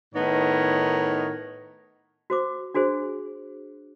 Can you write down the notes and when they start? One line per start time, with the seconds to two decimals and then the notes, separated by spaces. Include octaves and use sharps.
0.14 A2 D#3 B3 D#4 A#4 C#5
2.30 F#4 C5 D6
2.74 D4 F#4 G#4 C5